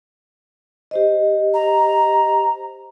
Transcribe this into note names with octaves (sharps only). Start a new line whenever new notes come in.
G4 C5 D#5
A#5